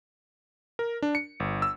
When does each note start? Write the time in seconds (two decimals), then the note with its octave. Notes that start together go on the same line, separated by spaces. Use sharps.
0.79 A#4
1.02 D4
1.15 C#7
1.40 G1
1.62 E6